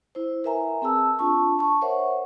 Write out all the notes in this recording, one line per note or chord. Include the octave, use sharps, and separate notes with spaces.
E4 C5
A#4 B4 E5 G#5 A#5
C4 G#4 A5 E6
D4 F4 A5 C#6
A5 C#6
A#4 C5 C#5 E5 F#5